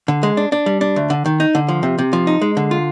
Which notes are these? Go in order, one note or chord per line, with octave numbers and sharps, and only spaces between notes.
D3
G#3
D4
D4
G3
D4
D2
D3
D#3
D#4
D3
F3
C3
C3
F3
D#4
G#3
D3
F4